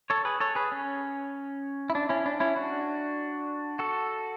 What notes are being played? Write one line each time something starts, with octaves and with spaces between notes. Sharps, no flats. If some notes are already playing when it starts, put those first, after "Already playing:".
A4 C#5
G#4 B4
A4 C#5
G#4 B4
C#4
E4
D4
C#4 E4
D4
C#4 E4
D4 F#4
F#4 A4